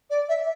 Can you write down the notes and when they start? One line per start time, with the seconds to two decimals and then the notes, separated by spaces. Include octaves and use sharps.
0.10 D5
0.29 E5